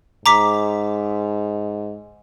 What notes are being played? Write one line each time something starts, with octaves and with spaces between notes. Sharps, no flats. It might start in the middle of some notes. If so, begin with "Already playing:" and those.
G#2 A#5 D6 B6